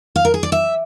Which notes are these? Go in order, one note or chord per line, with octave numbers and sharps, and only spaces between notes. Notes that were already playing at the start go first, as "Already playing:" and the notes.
F5
A#4
G#4
D5
E5